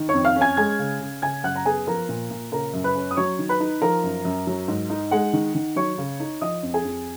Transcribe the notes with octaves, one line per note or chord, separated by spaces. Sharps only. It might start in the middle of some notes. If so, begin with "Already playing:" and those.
Already playing: D#3
C#5 C#6
F2
F5 F6
C#4
G#5 G#6
G#3 G#5 G#6
C#3
C#3
C#3 G#5 G#6
F#2 F#5 F#6
A#5
B3 G#4 G#5
F3 A#4 A#5
A#2
A#2
C#3 A#4 A#5
F#2
B4 B5
C#4
D#6
F#3 C#5 C#6
D#3
B4 B5
D#4
F3 A#4 A#5
F#2
F#2
F#3
G#2
D#4
G#3 F#5
D#3
D#3
F#3 C#5 C#6
C#3
D#4
F3 D#5 D#6
F2
G#4 G#5
F2